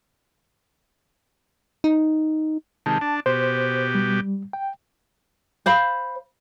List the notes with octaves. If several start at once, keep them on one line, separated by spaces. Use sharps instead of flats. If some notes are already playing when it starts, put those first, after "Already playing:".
D#4
C3 D#3 G#3 A5
D4
B2 G4 C5
G3
G5
C5 F5 B5